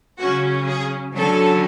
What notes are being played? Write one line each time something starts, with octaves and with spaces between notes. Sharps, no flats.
C#3 F#3 C#4 F#4
G#4
D3 F#3 C#4 A4